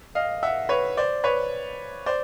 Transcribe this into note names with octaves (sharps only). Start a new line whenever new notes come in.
D#5 F5
E5 F#5
B4 C#5
C5 D5
B4 C#5
C5 D5